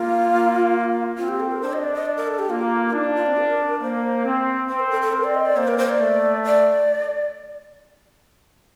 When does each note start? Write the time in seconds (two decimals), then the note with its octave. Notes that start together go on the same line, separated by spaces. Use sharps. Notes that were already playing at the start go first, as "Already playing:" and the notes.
Already playing: A#3 F4
0.30 A#3
1.18 C4 F4
1.29 G4
1.40 A4
1.51 A#4
1.62 D4 C5
1.73 D#5
1.83 D5
1.95 D#5
2.06 D5
2.17 A#4
2.28 A4
2.39 G4
2.50 A#3 F4
2.88 F4
2.93 D4 D#4
3.04 F4
3.15 F4
3.26 C4
3.37 A#4
3.81 A#3 C5
4.24 C4
4.69 C4 C5
4.80 A#4
4.90 A4
5.02 A4
5.13 C4 A#4
5.24 D5
5.34 D#5
5.46 D5
5.56 A#3 C5
5.68 A#4
5.78 C5
5.89 D5
6.00 A3
6.44 D5